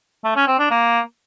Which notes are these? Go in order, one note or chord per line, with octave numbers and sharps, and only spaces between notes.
A3
C#4
C4
D4
A#3